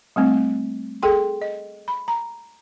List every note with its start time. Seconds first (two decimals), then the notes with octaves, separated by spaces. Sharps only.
0.16 G3 A3 C4
1.03 G#4 A4 G5 C6
1.42 D#5
1.88 B5
2.08 A#5